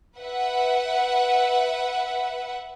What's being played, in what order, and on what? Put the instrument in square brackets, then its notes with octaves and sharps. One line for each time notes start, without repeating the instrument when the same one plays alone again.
[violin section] B4 E5 F#5